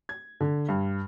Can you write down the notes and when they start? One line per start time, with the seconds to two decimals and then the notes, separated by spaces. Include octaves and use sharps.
0.09 G#6
0.40 D3
0.69 G2